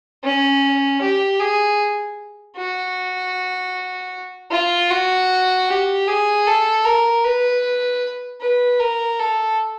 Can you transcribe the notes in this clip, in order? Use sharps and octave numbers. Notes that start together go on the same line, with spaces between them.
C#4
G4
G#4
F#4
F4
F#4
G4
G#4
A4
A#4
B4
B4
A#4
A4